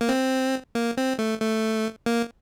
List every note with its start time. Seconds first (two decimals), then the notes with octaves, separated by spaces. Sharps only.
0.01 A#3
0.09 C4
0.75 A#3
0.97 C4
1.19 A3
1.40 A3
2.06 A#3